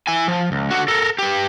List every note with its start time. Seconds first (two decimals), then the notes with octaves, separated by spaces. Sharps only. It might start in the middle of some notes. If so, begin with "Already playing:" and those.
0.07 E4 G#5
0.28 F3
0.52 C#2
0.71 D3 F#4
0.88 A4 A#4
1.19 G4 B4